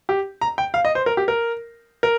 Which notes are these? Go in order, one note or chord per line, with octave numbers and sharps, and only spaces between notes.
G4
A#5
G5
F5
D#5
C5
A#4
G4
A#4
A#4